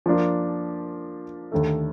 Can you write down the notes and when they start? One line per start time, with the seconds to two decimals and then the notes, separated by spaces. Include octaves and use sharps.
0.06 F3 A#3 D4 F4
1.52 D#2 D3 A3